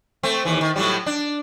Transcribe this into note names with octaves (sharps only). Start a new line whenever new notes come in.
A3 C4
D#2 E3
D#3
A2 F#3 G3
D4